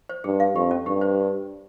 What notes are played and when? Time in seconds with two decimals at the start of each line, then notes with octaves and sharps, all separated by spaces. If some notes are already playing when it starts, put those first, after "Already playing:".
0.09 C5
0.24 G2 G#4
0.40 F5
0.55 F2 G4
0.71 C#4
0.86 G2 G4
1.01 C5